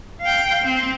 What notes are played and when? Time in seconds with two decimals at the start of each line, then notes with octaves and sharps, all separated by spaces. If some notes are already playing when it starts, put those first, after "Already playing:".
0.22 F5 G5
0.63 C4